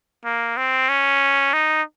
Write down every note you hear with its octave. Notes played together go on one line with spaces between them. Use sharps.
A#3
C4
C#4
D#4